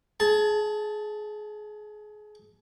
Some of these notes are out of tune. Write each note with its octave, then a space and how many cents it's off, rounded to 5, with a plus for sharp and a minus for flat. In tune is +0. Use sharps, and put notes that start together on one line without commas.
G#4 +25 A5 -5